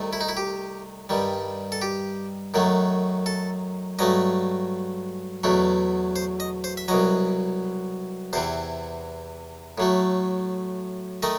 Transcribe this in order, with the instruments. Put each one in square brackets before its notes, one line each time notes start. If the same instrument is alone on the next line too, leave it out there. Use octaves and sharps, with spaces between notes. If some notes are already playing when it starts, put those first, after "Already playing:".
Already playing: [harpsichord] C2 C3 D#3 A3
E4
D#4
E4
G4
G2 D#3 G3
A4
G4
F#2 D#3 F#3 A3
A4
G2 F#3 A3 D#5
E2 B2 F#3 A3
C5
D#5
C5
E5
C2 B2 F#3 D#5
E2 C3 E3 C5
A2 F#3 A3
D#3 A3 D#5